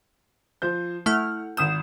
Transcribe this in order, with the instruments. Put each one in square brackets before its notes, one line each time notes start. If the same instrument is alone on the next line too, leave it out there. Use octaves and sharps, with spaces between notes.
[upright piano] F3 C5 G6
[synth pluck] A3 E4 F6 [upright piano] F#5
[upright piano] G#1 D#6 G6 [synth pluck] E7